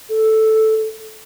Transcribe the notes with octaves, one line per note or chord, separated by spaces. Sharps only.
A4